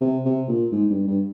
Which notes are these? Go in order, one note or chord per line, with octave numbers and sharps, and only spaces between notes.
C3
C3
A#2
G#2
G2
G2